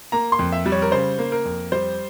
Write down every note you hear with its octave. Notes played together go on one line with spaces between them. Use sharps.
A#3 A#5
C6
F2
E5
G3
C#5
A#4
C#3 C5
A#3
A#4
F2
G3 C5